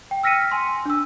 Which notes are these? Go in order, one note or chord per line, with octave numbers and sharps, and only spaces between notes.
G5
E6 F6 A#6 B6 C#7 D#7
G#5 C6
D4 E6